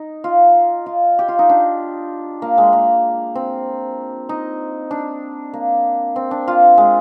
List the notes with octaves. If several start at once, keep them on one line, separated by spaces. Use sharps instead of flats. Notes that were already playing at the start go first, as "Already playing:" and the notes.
Already playing: D#4
F4
F4
G4
F4
D#4
D4
A#3
G#3
A#3
C4
D#4
D4
A#3
C4
D4
F4
G#3